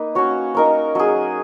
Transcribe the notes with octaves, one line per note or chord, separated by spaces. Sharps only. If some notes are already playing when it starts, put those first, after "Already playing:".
Already playing: A#3 D#4 B4
C#4 F#4 C#5
D#4 A#4 C#5
F#3 C#4 G#4